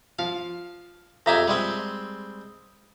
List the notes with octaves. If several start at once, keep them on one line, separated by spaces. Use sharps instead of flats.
F3 F5
F2 G4 G#4 E5 A#5
G3 G#3 C4